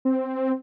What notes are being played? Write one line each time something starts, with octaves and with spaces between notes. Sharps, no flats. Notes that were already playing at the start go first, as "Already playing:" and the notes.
C4